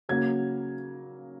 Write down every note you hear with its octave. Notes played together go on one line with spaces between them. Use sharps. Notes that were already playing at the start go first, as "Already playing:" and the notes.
C#3 F#3 A#3 G#6